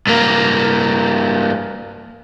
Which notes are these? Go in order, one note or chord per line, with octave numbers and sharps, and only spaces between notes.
G2 A#3